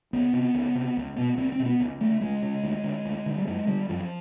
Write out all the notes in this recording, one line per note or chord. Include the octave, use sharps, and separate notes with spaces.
C#2 B3
C3
C#2
C3
C#2
B2 B3
C#2 C4
C4
B2
B3
C#2
C#3 A3
C#2 G#3
C#3
D2
D3
D2
D3
G3
F#2 G#3
D3 G3
F#2 F3